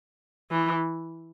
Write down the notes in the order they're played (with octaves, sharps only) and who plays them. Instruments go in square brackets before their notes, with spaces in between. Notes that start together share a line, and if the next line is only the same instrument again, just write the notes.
[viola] E3